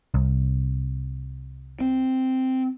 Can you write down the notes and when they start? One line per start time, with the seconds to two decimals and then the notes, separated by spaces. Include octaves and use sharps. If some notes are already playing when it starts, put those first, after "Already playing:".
0.14 C2
1.81 C4